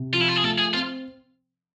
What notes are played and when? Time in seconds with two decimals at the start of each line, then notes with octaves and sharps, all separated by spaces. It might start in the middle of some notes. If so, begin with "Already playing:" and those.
Already playing: C3
0.13 F3 F4
0.21 E4
0.28 F4
0.36 G#4
0.44 A3 A4
0.58 G#4
0.74 C4 F4